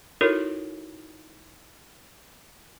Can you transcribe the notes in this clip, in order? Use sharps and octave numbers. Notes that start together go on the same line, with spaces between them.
D#4 E4 F#4 A4 A#4 C#5